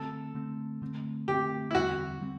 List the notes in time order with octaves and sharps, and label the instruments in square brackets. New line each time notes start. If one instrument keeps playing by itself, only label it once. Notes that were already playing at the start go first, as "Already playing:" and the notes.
Already playing: [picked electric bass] D3 A3 C4 [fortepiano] A4
[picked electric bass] D3 A3 C4
D3 A3 C4
[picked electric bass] D3 A3 C4 [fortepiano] G4
[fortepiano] E4
[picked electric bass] E2 D3 G3 C4 [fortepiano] F#4
[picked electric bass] D3 G3 C4